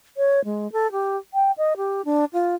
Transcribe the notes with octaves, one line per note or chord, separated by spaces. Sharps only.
C#5
G#3
A4
G4
G5
D#5
G4
D4
F4